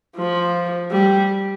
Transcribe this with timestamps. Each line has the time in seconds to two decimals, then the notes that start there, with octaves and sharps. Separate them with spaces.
0.16 F3
0.91 G3